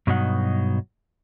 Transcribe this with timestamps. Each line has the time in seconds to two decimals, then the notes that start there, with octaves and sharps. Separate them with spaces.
0.07 G2 B2 F#3 D#4 F#5